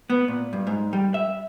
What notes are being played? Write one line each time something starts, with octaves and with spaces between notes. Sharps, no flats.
B3
A#2
G2
G#2
G3
E5